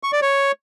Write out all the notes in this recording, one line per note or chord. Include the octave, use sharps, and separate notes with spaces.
C#6
D5
C#5